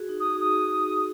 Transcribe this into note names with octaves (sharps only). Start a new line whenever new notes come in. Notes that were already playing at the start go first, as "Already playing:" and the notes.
Already playing: F#4 G#4
D#4
D#6
G#4
F#4
D#4 D#6
F#4